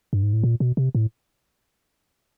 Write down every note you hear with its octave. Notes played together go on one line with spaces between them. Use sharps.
G2
G#2
A2
A#2
B2
C3
A2